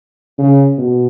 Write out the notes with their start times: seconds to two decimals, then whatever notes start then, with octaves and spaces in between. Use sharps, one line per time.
0.38 C#3
0.78 B2